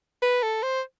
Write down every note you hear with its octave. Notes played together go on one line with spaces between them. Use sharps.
B4
A4
C5